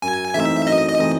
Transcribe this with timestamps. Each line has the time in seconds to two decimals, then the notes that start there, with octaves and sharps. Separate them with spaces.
0.02 F#2 G#5
0.34 E3 A3 C4 D#4 E5
0.66 F#2 D#5
0.89 D#5
0.99 E3 A3 C4 D#4